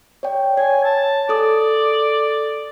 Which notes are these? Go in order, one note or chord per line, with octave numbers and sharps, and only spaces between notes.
C#5 D5 G5
C#5 G#5
A5
A4 D5 D#6